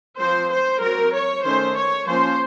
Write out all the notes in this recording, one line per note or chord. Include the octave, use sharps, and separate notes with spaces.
F3 C4 C5
C5
F#3 C4 A#4
C#5
D#3 A3 C#4 C5
C#5
F3 A#3 C#4 C5